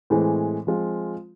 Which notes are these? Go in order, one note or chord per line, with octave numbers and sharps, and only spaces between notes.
A2 E3 G#3 C4
F3 G#3 C4 F4